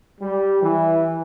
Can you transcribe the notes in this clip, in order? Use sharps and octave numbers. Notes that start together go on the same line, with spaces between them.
G3
E3